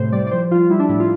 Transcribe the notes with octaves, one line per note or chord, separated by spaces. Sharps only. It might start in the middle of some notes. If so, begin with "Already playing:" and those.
Already playing: A2 C3 C5
G3 D5
D5
F3 C5
F3 F4
G3 E4
D4
A2 E4
F4